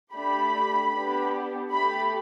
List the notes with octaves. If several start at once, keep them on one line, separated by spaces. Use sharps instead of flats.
A3 D4 G4 B5
B3 D4 G4
A3 G4 B5